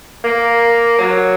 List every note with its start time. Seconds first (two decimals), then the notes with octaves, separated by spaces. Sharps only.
0.24 A#3
0.99 F#3